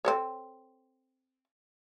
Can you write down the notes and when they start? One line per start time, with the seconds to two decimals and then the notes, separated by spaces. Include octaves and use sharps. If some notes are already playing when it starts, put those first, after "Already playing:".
0.05 C4 A4 C#5